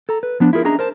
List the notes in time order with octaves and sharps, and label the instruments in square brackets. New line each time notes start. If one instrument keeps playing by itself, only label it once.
[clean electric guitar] A4 A#5
B4
F3 B3 D4
E4 F4 G#4 A#4
C#4 D4 G#4 D#5 E5 A#5
A#4 C5 A5